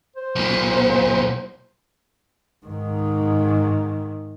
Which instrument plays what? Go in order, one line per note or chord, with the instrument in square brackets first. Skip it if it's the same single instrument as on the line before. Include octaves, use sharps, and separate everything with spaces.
[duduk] C5
[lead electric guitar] B1 A#2
[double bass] G#2 D#3